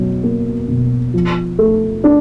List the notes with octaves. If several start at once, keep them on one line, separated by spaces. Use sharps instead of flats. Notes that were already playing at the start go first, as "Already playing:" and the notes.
Already playing: B2 F#3
A#3
B2
F3
A3
D4